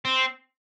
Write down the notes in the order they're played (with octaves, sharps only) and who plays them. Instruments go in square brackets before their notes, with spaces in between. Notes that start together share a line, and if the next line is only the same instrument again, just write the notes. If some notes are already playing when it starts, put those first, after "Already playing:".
[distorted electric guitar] C4